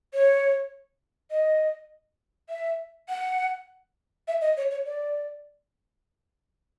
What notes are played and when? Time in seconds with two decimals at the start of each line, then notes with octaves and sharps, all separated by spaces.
0.14 C#5
1.31 D#5
2.50 E5
3.09 F#5
4.28 E5
4.41 D#5
4.57 C#5
4.71 C#5
4.86 D5